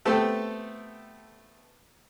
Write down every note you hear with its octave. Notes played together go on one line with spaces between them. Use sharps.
A3 B3 C4 G4 A4